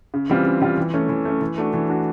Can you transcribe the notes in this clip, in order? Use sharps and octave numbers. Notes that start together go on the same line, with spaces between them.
C#3
E3 G3 C4 F4
C#3
E3 G3 C4 F4
E3
A3 C#4
E3
A3 C#4
E3
A3 D4 F#4
E3
A3 D4 F#4